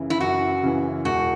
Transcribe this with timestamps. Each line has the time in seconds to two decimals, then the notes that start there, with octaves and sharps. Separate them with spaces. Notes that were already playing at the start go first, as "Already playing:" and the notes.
Already playing: F#2 C#3 E3
0.10 E4
0.20 F#2 F#4
0.63 C#3 E3
1.05 E1 F#4